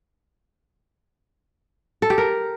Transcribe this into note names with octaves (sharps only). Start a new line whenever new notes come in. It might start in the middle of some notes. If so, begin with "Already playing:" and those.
A4
G4
A#4